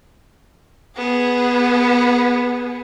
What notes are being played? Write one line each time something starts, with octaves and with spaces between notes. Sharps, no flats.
B3 G#4